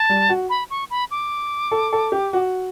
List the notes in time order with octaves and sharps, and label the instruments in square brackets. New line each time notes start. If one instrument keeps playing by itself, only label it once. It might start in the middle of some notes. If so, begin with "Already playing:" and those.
Already playing: [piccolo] A5
[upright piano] G3
F#4
[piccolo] B5
C#6
B5
D6
[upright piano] A4
A4
G4
F#4